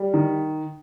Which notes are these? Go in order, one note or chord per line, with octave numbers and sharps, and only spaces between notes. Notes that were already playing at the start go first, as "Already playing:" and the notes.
Already playing: G3
D#3